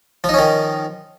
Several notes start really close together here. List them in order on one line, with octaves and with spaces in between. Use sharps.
F3 D#4 C#4 D#3